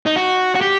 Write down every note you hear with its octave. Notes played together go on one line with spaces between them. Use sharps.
D#4
F#4
F#4
G4